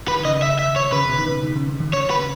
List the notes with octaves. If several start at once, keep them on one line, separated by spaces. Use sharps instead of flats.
D#3 B4
D#3
C#3 D#5
E5
E5
C#5
C#3 B4
B2
D#3
C#3
D#3
C#3
C#3
D#3
C#3 C#5
B4
C#3